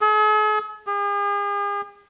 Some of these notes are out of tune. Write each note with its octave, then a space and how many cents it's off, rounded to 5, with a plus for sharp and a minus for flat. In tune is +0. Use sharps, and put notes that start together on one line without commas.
G#4 +45
G#4 -45